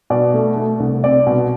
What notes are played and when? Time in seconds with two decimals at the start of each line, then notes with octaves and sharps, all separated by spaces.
0.10 B2 D5
0.34 A3
0.56 A3
0.80 C2
1.04 C4 D5
1.27 B2